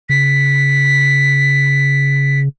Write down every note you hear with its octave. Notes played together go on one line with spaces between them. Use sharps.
C#3 B6